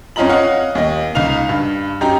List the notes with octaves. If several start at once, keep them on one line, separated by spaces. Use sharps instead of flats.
F2 C#4 F4 D#5 A#5 F#7
C#5 D#5 F5 F#5
D#2 D#5
C#2 D#4 F5 F7
G2
F#2 D#4 G4 A#5